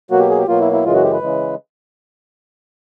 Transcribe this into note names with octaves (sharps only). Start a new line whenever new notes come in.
B2 F#3 A#3 F#4
G4
G#4
G4
B2 F#3 A#3 F4
E4
E4
F#2 C#3 E3 G#3 F4
F#4
G4
B4
C#3 E3 G#3